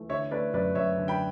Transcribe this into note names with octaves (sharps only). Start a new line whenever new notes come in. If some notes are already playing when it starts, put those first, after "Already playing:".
Already playing: E3 A3
D3 C#5 E5
A3 B4 D5
F#2 B4 D5
F#2 C#5 E5
D3
G5 B5